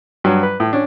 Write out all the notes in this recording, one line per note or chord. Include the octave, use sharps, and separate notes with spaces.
G2 F#3
B4
A2
C#4 D4